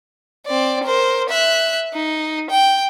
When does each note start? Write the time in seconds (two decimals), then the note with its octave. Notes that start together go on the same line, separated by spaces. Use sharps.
0.47 C4 D5
0.84 A#4 C5
1.29 E5 F#6
1.94 D#4
2.50 G5